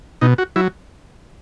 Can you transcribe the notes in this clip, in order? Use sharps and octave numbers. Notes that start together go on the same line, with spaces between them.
B2 D#4
F#4
F#3 E4